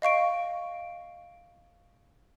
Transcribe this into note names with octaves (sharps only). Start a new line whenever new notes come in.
D#5 F5 C#6 D7